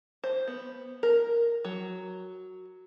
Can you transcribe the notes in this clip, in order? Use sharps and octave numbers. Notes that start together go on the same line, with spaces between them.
C5
B3
A#4
F#3